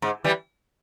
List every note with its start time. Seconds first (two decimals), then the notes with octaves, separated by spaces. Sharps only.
0.02 G#2
0.24 E3 G3